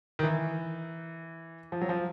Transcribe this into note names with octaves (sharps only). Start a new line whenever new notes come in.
D#3
E3
F3
F#3
F3